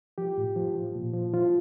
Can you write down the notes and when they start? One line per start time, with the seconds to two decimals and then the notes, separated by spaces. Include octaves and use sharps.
0.18 F3 G4
0.38 A2
0.56 F3
0.75 F3
0.95 A#2
1.13 F3
1.34 F3 F4